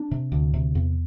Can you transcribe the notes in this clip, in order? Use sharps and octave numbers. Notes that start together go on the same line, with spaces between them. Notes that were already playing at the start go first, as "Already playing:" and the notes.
Already playing: D4
C3
D2
C3
E2